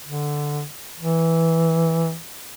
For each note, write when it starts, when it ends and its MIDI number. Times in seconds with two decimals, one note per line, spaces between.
0.05 0.65 50
1.00 2.15 52